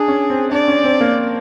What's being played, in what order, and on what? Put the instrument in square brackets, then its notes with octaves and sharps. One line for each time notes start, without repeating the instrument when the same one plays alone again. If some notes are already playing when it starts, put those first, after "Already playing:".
Already playing: [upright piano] D4 [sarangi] G#4
[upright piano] C#4
C4
[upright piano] D4 [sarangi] D5
[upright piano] C#4
C4
A#3